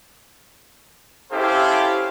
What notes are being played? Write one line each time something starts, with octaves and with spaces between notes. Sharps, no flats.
C#4 E4 G4 A4 C5 F5